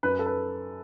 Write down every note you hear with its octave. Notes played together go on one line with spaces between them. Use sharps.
F#2 B4
A4
B4